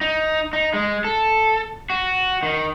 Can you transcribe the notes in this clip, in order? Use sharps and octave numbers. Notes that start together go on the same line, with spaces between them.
D#4
D#4
G#3
A4
F#4
D#3